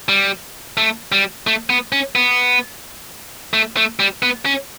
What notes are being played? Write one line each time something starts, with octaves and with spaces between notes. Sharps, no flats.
G3
A3
G3
A3
B3
C#4
B3
A3
A3
G3
B3
C#4